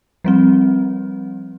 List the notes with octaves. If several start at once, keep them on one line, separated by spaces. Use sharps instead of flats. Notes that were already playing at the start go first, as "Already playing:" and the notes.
F3 G3 C4